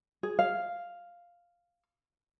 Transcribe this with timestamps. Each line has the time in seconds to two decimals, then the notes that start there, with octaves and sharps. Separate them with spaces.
0.23 G#4
0.39 F5